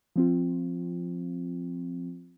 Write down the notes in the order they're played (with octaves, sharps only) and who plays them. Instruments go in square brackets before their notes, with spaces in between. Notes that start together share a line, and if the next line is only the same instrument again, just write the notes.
[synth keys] F3 C4 F4